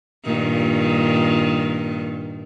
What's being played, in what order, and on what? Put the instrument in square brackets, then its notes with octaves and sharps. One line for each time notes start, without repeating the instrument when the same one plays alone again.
[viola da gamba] G2 A#2 D#3